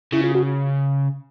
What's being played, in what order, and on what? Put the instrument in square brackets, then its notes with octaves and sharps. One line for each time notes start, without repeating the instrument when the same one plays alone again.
[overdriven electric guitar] C#3 [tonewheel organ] E4
[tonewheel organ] F4
F#4